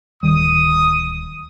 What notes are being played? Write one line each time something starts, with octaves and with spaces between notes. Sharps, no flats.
D1 D#3 G3 D#6